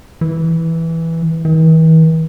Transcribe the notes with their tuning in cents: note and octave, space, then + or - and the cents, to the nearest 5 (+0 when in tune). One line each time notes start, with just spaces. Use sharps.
E3 -5
E3 -45